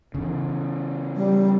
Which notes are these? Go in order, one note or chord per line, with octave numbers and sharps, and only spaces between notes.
C#3 E3
G3